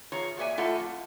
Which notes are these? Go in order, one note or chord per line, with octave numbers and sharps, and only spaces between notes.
E3 F4 G#4 C#5 A#5
A#2 F#4 G#4 D5 E5 G#5
A3 E4 F4 A4 D#5 F#5
F2